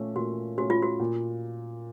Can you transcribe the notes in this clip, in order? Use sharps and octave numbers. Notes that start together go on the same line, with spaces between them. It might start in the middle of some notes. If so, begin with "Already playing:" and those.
Already playing: A#2 A3 C#4
A#2 F#4
A3 C#4 F#4
F4
F#4
A#2